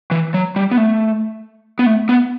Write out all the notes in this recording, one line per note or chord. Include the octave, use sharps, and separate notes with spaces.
E3
F#3
G3
B3
A3
B3
A3
B3